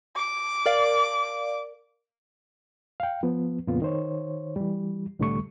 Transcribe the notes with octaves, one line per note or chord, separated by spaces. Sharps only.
D6
A#4 D5 F5
F5 G5
F3 B3
F2 A#2 C#3 A#3 B3 F4
D#3 C5 C#5
E3 G3
C2 A2 D3 G3 A3 C#6